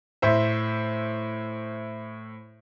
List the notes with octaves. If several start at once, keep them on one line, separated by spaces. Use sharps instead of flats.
A2 C5 E5